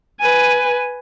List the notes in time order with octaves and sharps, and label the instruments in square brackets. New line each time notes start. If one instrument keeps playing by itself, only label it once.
[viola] B4 G#5